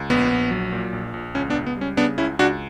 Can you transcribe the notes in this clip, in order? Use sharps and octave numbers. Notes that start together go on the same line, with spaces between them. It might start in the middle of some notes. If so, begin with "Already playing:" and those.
Already playing: C#2
A#1 B3
A#1
F#3
A#2
A#1
A#1
C#2 C#4
B3 D4
C#2
B3
G3 C#4
C#3 B3 D4
C#2 C#4 E4
C#2 D4 F#4